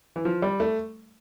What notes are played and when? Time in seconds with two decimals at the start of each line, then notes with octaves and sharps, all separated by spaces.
0.16 E3
0.25 F3
0.42 G3
0.60 A3